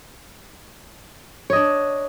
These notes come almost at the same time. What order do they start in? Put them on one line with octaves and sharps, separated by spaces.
C#5 D#5 D4